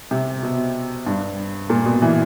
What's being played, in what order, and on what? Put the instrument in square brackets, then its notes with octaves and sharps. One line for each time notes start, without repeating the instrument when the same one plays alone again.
[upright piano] C3
B2
G2
A#2
B2
E3